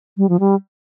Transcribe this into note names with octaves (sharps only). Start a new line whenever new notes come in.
G3
F3
G3